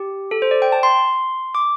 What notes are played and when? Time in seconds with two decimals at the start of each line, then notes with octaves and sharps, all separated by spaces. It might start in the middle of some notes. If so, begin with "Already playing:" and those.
Already playing: G4
0.31 A4
0.42 C5
0.51 D5
0.62 G5
0.72 A5
0.83 C6
1.55 D6